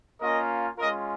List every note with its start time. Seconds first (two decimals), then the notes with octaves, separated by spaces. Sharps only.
0.20 A#3 C#4 F4 A#4 D#5
0.78 G#3 C#4 F4 A#4 D#5